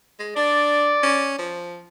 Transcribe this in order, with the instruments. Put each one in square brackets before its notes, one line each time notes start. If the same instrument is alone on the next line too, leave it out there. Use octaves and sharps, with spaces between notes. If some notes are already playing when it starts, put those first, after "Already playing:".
[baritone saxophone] G#3
[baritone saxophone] D4 [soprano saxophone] D5
[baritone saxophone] C#4
F3